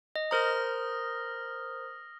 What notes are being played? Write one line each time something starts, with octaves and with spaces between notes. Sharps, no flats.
D#5
A#4 C5 A#5 D#6 F6 A#6